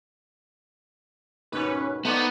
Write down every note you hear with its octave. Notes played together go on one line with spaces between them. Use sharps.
D#2 G#2 B2 C#4 B4
A3 B3 D#4 C5 D5